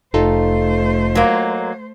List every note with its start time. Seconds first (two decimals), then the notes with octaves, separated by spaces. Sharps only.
0.14 F1 A3 D#4 F4 A4 C5
1.15 F#3 A#3